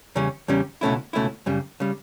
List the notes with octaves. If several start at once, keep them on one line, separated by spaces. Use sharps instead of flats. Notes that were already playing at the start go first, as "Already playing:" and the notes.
E2 C#3 G3 C#4
E2 C#3 G3 C#4
C#2 B2 A3 C#4 E4
C#2 B2 A3 C#4 E4
F#2 C#3 G3
C#3 G3